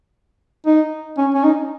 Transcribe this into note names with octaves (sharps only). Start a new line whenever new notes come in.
D#4
C#4
C#4
D#4